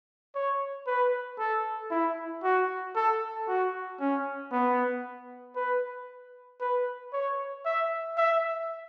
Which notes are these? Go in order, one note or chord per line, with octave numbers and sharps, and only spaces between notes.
C#5
B4
A4
E4
F#4
A4
F#4
C#4
B3
B4
B4
C#5
E5
E5